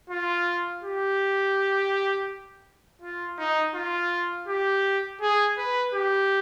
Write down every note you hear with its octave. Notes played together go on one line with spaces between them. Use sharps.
F4
G4
F4
D#4
F4
G4
G#4
B4
G4